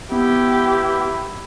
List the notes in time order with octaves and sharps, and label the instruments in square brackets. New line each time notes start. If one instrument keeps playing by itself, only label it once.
[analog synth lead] B3 [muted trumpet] E4 [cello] G4